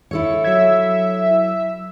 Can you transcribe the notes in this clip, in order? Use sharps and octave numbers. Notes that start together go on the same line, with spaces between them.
E4 A4 C#5
F#3 E5 G#6